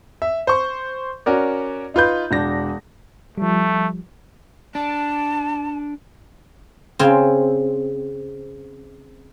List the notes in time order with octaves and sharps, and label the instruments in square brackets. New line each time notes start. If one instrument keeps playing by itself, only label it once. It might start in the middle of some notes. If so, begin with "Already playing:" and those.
[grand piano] E5
C5 C#6
C#4 F#4 A#4 D5
D#4 F4 B4 G6
E1 D4 A#6
[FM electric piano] F3 G3 [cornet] A3
[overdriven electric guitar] D4 [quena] A5
[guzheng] C#3 C4